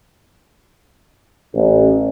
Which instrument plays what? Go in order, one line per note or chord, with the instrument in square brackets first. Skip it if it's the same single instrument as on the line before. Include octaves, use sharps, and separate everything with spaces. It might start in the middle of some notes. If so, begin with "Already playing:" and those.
[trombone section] A1